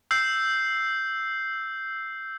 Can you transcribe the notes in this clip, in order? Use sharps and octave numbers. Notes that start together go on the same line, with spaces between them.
E6 G6 C7